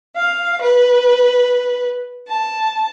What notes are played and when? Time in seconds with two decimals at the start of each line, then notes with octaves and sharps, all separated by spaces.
0.14 F5
0.61 B4
2.28 A5